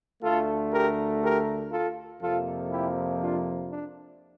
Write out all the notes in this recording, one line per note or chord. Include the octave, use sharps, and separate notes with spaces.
D2 D3 A3 F4 A4
G4 A#4
G4 A#4
F4 A4
F2 C3 F3 A#3 F4 A4
E4 G4
D4 F4
D4